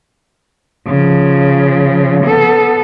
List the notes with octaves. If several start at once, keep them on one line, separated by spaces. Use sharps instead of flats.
C#3 F3
B3 A4